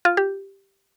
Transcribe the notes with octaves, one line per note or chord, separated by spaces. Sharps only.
F4
G4